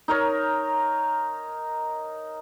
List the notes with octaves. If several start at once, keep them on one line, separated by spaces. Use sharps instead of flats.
D#4 A#4 C#5